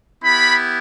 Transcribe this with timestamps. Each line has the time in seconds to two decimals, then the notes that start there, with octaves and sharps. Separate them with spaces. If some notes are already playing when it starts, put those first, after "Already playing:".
0.23 B3 E4 G4 B5